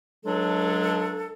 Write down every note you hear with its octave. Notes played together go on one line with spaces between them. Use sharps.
C#2 F#3 G#3 D4 A4